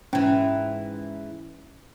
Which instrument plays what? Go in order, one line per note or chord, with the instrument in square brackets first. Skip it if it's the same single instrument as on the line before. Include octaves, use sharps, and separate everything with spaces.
[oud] G#2 E3 [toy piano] C#4